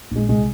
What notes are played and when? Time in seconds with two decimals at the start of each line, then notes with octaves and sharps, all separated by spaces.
0.11 A#1 G#3
0.28 C2 G#3